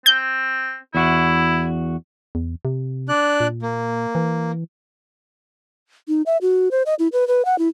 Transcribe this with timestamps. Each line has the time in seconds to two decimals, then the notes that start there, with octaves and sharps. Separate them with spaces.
0.06 C4 G6
0.95 E2 E4 F#4
2.35 E2
2.65 C3
3.09 D4 D5 F#6
3.40 A#2
3.62 A#3
4.15 E3
6.08 D#4
6.26 E5
6.42 F#4
6.71 C5
6.86 D#5
6.99 E4
7.13 B4
7.28 B4
7.45 F#5
7.59 E4